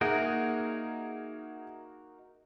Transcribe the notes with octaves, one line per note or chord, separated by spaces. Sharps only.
A#3 D#4 F#4 G#4 A#4 E5 F#5